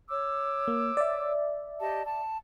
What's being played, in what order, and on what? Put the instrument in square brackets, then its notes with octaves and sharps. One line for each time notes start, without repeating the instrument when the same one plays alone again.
[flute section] C#5 D6 E6
[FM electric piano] A#3
D5 E5
[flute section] G4 D#5 A5
A5